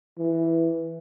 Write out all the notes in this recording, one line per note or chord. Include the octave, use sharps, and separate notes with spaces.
E3